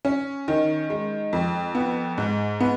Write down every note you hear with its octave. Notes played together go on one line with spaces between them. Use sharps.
C#4
D#3
G#3
F2
B3
G#2
B3